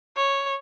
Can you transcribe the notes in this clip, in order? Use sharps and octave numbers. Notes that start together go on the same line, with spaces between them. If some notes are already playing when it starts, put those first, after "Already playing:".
C#5